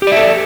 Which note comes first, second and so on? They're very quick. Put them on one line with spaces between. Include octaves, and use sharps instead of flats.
G4 D5 E5 A4